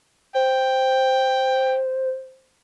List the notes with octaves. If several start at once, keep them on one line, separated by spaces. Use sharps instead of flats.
C5 G5